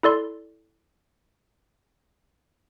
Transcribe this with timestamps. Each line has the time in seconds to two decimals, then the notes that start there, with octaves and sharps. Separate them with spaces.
0.03 E4 A4 D5 C6